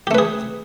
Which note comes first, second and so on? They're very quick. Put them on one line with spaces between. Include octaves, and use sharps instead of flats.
G4 A3 B4 G#4